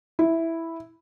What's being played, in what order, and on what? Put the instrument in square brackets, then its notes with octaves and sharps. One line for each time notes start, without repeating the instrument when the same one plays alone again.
[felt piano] E4